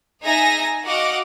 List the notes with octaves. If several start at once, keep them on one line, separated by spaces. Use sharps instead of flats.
D#4 G#4 E5 G#5 A#5 A#6
F#4 D#5 F5 F#5 D6